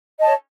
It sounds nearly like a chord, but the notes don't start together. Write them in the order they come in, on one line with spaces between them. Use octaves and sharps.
D#5 A5 C#5